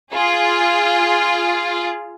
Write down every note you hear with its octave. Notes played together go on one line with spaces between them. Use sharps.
F4 G#4